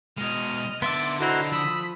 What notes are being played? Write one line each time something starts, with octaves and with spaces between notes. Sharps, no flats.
B2 G#3 D#5 F6
D3 B3 E5 C6 D6 E6 A6
E4 F#4 A4 C5 D#5 A#5
F3 B5 D#6 E6